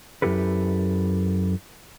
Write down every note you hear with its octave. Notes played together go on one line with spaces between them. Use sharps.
F#2 C3 E4 G4 A4 B4